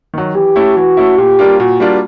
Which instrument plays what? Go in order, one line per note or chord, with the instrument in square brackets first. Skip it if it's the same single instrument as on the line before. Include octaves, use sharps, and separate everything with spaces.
[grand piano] D#3 F#3
[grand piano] E3 [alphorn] G4
[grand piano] A3 C#4 E4
[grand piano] E3 [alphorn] F#4
[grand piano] A3 C#4 E4
[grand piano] A#2 [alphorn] G4
[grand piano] G3 A#3 D4 F4
[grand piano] A#2 [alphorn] F#4
[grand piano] G3 A#3 D4 F4